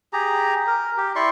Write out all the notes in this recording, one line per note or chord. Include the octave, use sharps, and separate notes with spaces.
G4 G#4 A#5
A#4
G4
E4 D5 C6 C#6